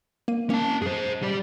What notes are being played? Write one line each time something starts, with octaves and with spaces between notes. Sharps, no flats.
A#3 D#7
A#3 C#4 A5
F#2 G#4 C5
G3 D5